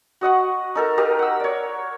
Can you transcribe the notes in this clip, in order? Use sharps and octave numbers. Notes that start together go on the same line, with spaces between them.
F#4 D#5 F#5 C#6
D#4 A4 A#4
G4 A#4 D#5 F5
F#5 E6
C#5 D5